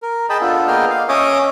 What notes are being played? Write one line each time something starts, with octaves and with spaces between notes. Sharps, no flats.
A#4
G#4 D#5 G5 A5 B5
B3 D4 F4 A4
A#3 B3 G#4 D#5 G5 F6
F5
C#4 C#5 D#5 E5 D6 D#6